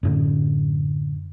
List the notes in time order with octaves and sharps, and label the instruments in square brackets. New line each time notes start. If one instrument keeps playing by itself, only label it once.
[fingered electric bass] F#2 A2 D3